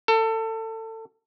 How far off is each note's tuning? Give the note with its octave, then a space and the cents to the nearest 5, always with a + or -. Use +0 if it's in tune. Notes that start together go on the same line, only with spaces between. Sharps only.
A4 +25